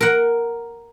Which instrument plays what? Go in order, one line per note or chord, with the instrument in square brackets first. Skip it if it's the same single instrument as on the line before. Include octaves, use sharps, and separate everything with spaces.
[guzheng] A#4 F#5